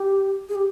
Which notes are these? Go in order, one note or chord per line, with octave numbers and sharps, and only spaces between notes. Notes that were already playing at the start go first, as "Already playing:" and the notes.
Already playing: G4
G#4
G4